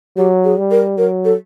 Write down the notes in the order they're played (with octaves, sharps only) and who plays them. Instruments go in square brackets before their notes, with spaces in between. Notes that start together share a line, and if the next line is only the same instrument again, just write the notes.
[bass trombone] F#3 [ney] G4
[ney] G#4
[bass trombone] G3
[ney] A#4
[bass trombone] F#3 [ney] A#4
[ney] A4